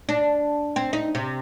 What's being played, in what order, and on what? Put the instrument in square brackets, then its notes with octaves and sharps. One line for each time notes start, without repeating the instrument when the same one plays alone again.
[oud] D4
C4
D#4
C3